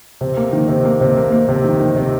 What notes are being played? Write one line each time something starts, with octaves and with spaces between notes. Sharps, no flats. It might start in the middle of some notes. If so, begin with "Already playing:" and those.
C3
A#3
D#3
C3
A#3
C3
A#3
A#3
C3
D#3
D#3
C3